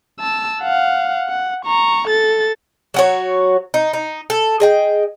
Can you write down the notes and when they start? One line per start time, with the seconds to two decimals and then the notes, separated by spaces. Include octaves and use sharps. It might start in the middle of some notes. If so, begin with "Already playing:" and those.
0.20 A5 E6
0.62 F5 F#5
1.29 F#5
1.65 A#5 C#6
2.08 A4 A6
2.94 F#3 F#4 C#5
3.74 D#4
3.93 D#4
4.30 A4
4.60 G#4 D#5 G5